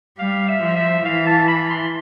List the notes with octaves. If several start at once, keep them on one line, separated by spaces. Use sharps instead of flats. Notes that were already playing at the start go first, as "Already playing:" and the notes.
G3 F5
E5
F3
E5
E3 F5
A5
B5
C6